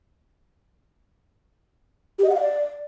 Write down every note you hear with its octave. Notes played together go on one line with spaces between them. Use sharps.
G4
D#5
F#5
F5
D5